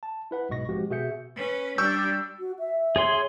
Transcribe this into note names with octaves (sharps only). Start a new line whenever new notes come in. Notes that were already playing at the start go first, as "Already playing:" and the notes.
A5
E4 B4 F#5
B1 G#2 B2 D#5 C#6 A#6
F3 G#3 C4 F#4 G4
B2 F#4 G#4 E5 G6 C#7
C#4 B4
G3 D4 C#6 E6 G6
F#4
E5
G#4 C#5 C6